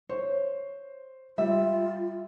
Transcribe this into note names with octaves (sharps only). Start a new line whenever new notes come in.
C5 C#5
G3 F4 E5